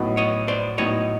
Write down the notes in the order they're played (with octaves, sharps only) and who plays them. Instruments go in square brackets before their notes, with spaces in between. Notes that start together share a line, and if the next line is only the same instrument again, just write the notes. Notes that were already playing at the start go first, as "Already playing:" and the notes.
Already playing: [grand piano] A2 F#3 B3 D#4
[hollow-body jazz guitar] C#5 D#5
C5 D5
[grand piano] A2 F#3 B3 D#4 [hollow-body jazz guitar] C#5 D#5